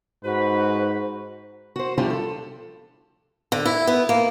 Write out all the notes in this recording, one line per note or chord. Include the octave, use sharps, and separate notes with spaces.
G#2 F#4 B4 C5
F#4 C5
F3 G3 D4 E4 F4 G4
A4
D3
E4
B3
A#3